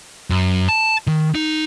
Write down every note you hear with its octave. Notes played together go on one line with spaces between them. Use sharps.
F#2
A5
D#3
D#4